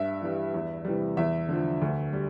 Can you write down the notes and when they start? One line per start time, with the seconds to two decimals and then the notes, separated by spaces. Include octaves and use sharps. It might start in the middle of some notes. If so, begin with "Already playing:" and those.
Already playing: G2 E5
0.22 E3 G3
0.54 E2
0.85 C3 E3 G3
1.17 E2 E5
1.49 D3 F3
1.82 D2
2.13 G3